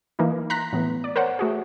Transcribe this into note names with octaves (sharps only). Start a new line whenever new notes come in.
E3 A#3 D#4
A#5 C6 F#6 A#6 B6
A2 E3 B3
D5
A#4 C5 C#5 F#5
A3 F#4 G#4